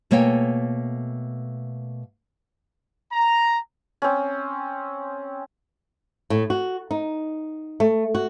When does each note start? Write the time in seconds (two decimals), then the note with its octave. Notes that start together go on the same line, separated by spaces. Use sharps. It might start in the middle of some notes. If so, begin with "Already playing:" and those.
0.11 B2 A3 A#3 C#5 G5 G#5
3.12 A#5
4.02 C4 C#4
6.30 A2
6.50 F#4
6.91 D#4
7.80 A3
8.15 F#4